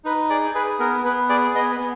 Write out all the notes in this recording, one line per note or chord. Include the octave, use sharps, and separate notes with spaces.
D#4 B4
G#4 D5
G#4 B4
B3 A#4
B3 B4
G#4 D5
B3 D#5
B4
B3